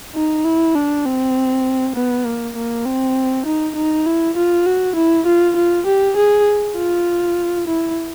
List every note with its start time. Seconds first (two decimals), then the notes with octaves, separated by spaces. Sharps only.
0.15 D#4
0.45 E4
0.76 D4
1.05 C4
1.96 B3
2.26 A#3
2.56 A#3
2.86 C4
3.46 D#4
3.76 D#4
4.06 E4
4.37 F4
4.66 F#4
4.96 E4
5.27 F4
5.56 F4
5.86 G4
6.17 G#4
6.77 F4
7.68 E4